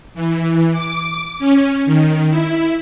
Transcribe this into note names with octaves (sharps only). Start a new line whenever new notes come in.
E3
D6
C#4
D#3
E4